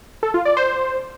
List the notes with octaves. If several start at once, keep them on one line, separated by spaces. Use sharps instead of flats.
A4
F4
D5
C5